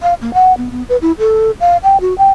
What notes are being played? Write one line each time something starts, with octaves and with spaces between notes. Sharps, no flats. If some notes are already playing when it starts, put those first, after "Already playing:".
F5
A#3
F#5
B3
B3
B4
E4
A4
F5
G5
F#4
G5